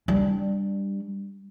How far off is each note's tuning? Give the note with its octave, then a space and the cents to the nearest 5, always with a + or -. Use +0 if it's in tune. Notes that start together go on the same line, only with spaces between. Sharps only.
G3 +10 D4 +0